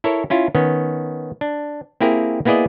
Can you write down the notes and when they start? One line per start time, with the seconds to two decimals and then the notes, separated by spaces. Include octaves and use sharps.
0.04 E4 A4 A#4 C#5
0.30 C#4 E4 F4
0.55 D#3 B3 C#4
1.41 D4
2.01 A#3 C4 E4 G4 G#4 A#4
2.45 A#3 B3 E4 G#4 D5 D#5